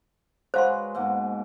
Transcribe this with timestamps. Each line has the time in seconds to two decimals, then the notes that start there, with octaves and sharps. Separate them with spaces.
0.54 F#3 G#3 B4 C5 F5 C6
0.95 G#2 B2 A#3